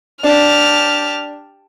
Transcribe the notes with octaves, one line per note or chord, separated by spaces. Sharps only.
D4 G4 A5 F6